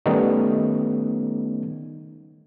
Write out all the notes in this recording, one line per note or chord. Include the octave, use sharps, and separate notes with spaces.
D#3 G3 A3 B3 C#4 D#4